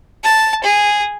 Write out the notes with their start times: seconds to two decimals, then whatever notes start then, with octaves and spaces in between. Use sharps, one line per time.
0.24 A5
0.64 G#4